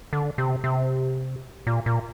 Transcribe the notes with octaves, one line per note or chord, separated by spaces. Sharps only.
D3
C3
C3
A#2
A#2